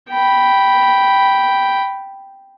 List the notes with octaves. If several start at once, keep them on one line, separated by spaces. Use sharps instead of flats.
G5 B5